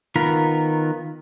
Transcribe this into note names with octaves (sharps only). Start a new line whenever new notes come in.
D#3 B3 F4 A#4 B5